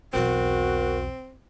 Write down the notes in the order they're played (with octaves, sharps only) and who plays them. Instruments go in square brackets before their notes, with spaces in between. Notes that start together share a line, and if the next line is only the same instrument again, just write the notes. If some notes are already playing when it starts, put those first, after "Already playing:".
[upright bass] B1 E2 [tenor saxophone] C4 [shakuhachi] F#4 [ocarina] A#4